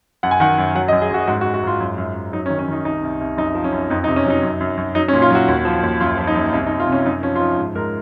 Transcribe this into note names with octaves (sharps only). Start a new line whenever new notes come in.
F#2 F#5
G#5
D#3 F#5
F#2
F#3 F#5
D#5
F#2
G#4
F#2 F#4
G#2 F#4
F#4
G#2
F#4
G#2 F4
F#2
F#2
F#2
F#3 D#4
C#4
D#3
C#4
D#3 D#4
C2 D#4
C2
C2
F#2 D#4
F3
C#4
F#2
F2 D#4
D#4
C3
C#4
F#3 D#4
F#2
F#2
F#2
F#3 D#4
C#4
A#2
F4
F#3 F#4
D#2
F3
D#2
F#2 F4
F3
D#4
F#2
C2 D#4
D#4
C2
F4
C3 C#4
F#2 D#4
F3 C#4
F4
F3 D#4
G#2
G#2 A#4